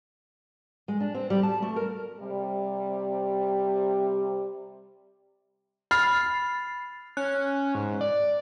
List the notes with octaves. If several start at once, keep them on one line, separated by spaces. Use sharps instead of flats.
G#3
D4
C4
G3
A5
A3
A#4
C3 G3
B5 F6 A6 C7
C#4 F#6
G#2
D5